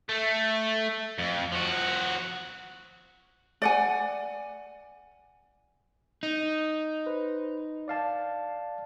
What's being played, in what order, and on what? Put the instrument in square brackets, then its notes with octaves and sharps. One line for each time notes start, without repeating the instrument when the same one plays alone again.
[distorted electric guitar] A3
F2
F3 F#4
[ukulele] D5 F#5 G#5
[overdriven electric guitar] D#4
[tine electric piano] B4 C5
D5 F5 A5